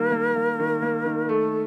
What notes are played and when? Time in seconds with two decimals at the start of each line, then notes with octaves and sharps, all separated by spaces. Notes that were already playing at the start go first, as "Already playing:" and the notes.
Already playing: D#3 G3 A#3 A#4
0.12 A#3
0.36 A#3
0.59 D#3
0.82 A#3
1.05 D#3
1.29 A3 A4